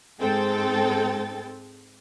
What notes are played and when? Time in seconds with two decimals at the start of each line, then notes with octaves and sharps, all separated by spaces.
0.19 G#2 G#3 C4 A4 G5 A6